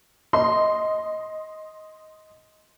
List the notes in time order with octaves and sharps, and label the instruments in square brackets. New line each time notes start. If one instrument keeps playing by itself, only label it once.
[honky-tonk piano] D#5 C6